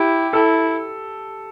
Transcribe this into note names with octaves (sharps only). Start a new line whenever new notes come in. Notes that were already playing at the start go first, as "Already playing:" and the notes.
Already playing: E4 G4
E4 A4